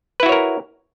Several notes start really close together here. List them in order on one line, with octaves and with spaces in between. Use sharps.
B4 E4 F#4 C#5 A#4